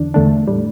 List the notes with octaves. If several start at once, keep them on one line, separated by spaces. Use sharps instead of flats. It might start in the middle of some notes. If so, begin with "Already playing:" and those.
Already playing: E2 D3 D4
E2 D3 A3 D4
A2 G3